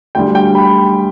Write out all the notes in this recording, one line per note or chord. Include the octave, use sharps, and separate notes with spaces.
D2 D3 G3 G5
G5
B5